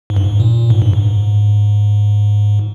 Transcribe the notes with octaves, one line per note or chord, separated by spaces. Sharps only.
G#2
G2
G#2
A#2
G#2
G2
G#2